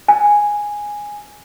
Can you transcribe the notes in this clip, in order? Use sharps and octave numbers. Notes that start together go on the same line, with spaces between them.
G#5